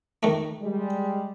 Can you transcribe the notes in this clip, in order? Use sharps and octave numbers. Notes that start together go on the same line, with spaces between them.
D#3 A3
G3 G#3